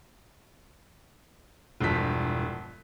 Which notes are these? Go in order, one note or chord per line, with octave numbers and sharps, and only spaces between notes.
E1 G2 F3 B6